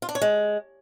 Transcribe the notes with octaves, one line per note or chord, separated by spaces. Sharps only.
F4
D4
C#5
G#3